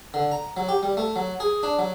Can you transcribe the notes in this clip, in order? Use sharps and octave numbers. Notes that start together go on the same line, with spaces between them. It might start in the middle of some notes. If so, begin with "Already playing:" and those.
D3
A#5
F#3
G4
G3
A3
F#3
G#4
D4
F#3